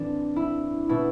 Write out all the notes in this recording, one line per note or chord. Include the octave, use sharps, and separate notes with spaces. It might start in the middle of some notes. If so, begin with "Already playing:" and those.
Already playing: A2 E3 C4 D4
E4
B2 E4